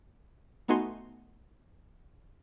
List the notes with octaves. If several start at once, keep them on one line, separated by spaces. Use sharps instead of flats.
A3 B3 D#4 F#4 G#5 C6